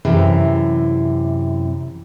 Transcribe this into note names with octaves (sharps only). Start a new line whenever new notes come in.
F#2 C3 E3